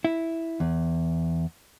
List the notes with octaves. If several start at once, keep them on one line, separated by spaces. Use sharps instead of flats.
E4
E2